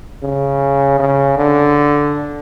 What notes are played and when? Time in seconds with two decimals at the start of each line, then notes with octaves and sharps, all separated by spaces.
0.23 C#3
0.99 C#3
1.38 D3